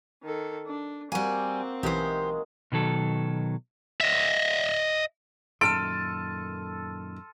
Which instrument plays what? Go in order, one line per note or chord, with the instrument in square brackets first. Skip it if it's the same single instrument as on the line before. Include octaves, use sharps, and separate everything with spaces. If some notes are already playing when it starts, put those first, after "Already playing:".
[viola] D#3 A4
D4
[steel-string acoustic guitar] G3 G#5 [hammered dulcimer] A#3 F#4 F#5 [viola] C4
[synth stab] B1 E3 [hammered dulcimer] D#3 G#3 G#4 [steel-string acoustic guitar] G4 C5
[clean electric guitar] B2 D#3 F#3 A4
[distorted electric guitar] D#5 E5
[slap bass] F#2 A#2 D#3 [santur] A4 [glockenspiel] C6 F6 D#7 [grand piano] D7